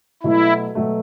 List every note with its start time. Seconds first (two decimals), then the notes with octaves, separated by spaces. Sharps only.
0.23 B2 F#3 A3 E4
0.75 B2 F#3 A3